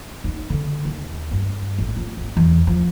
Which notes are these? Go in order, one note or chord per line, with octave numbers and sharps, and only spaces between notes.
D#4
D3
D#2
G2
A1
F4
G#1
E2
F3